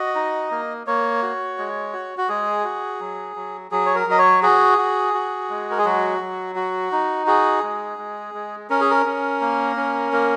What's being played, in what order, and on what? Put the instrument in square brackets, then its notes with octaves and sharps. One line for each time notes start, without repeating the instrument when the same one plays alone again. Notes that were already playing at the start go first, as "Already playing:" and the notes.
Already playing: [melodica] F#4 D#5
D#4
A#3
A#3 C#5
F#4
G#3
F#4
F#4
G#3 G#4
F#4
F#3
F#3
F#3 G#4
C#5
A#4
F#3 D#5
C#5
F#4 G#4
F#4
F#4
G#3
A#4
G#4
F#3 F#4
F#3
F#4
D#4
F#4 G#4
G#3
G#3
G#3
C#4 A#4
G#4
A#4
C#4
A#3
C#4
A#3